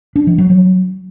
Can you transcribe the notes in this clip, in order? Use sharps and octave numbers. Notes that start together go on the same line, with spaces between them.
D4
F3
F#3
F#3